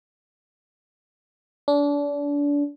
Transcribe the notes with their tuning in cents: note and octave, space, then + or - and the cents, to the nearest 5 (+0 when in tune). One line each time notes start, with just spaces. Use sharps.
D4 -30